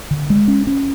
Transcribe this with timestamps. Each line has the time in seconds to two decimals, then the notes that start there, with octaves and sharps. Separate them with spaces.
0.11 D3
0.30 G#3
0.48 C#4
0.67 C#4